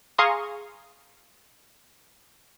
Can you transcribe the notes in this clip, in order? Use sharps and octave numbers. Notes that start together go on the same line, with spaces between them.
G#4 F5 A#5 C6 C#6 D#6